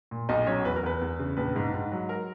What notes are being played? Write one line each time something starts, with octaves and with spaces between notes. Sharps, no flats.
A#2
B1 D#4 D#5
F#3 C#4 C#5
E2 B4
A#4
E2 B4
E2
C#3
A#1 B4
G#2
G#2
F#3
A#4